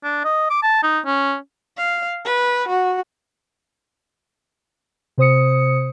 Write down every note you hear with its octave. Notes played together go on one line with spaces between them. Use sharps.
D4
D#5
D6
A5
D#4
C#4
F5
B4
F#4
C3 C5 D#6 C#7